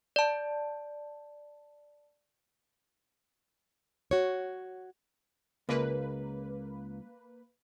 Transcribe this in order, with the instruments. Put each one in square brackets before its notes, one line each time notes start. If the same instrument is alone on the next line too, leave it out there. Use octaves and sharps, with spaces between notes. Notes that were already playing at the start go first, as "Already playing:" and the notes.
[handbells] D5 A5
[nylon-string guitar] F#4 C#5
[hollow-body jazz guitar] C#2 [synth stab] A#3 B4